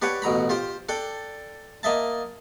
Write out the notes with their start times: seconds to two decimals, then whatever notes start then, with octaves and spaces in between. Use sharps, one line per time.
0.02 D4 G4 B4 C#5 F#5
0.22 A1 B2 A#5 B5
0.49 F4 G4 C5
0.89 D4 A4 D5 G5
1.83 A#3 D#5 E5 A5